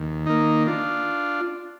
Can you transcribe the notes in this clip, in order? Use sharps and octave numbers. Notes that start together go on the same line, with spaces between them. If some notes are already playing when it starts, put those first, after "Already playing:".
Already playing: D#2
D#3 A#3 D#4
D4 F4